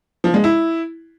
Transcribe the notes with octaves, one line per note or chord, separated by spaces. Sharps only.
F3
G#3
E4